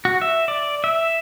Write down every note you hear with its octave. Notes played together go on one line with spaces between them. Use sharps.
F#4
E5
D5
E5